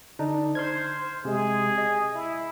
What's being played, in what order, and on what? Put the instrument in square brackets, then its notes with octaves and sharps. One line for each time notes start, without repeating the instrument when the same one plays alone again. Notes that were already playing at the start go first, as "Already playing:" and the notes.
[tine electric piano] D3 D4 D#4
[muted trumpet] C5 [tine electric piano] C6 F6 G#6
[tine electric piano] C3 G#3 [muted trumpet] G#4
[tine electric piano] D#5
[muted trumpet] E4